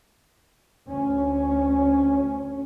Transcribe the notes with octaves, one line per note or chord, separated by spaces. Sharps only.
D2 C#4